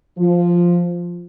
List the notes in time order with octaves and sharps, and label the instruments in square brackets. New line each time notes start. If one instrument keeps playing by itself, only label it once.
[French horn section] F3